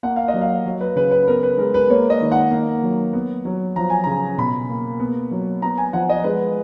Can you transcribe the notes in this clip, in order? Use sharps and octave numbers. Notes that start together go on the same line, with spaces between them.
A#3 F#5
F5
D#5
F#3
F5
F#3
B4
C#3 B4
B4
B3 A#4
B4
G#3 A#4
B4
A#3 C#5
D#5
D#3
F#5
A#3
F#3
B3
F#3
F3 A#5
G#5
C#3 A#5
B2 B5
A#3
B3
F#3
B3 A#5
G#5
F3 F#5
D#5
G#3 B4